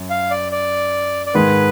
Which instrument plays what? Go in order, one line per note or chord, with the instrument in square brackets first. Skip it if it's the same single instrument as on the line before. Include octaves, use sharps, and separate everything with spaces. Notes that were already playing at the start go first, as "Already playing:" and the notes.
Already playing: [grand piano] F#2
[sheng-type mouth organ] F5
D5
D5
D5
[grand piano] G#2 D#3 G#3 [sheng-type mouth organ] B4